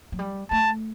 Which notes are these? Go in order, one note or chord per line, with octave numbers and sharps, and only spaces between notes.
F#3
G3
A3 A5